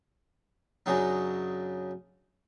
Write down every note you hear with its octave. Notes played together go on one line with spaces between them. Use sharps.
F#2 C#3 F#3 D4 D#4